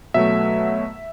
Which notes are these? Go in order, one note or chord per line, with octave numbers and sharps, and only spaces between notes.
B2 F#3 A3 E5